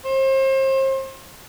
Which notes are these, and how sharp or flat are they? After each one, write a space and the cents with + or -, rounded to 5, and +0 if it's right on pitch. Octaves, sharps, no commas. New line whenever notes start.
C5 +35